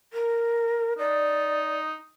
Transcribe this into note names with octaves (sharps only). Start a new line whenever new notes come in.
A#4
D#4 D5